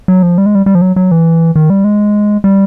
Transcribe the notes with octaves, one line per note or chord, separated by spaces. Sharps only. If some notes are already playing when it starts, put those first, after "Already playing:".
F#3
F3
G3
G#3
G3
G3
F3
F#3
F#3
E3
D#3
G3
G#3
G3